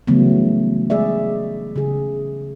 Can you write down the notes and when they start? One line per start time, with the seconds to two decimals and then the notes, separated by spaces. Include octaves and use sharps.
0.07 C#3 E3 F#3 G3 A3 B3
0.90 G#3 G#4 D5 E5
1.76 C#3 G#4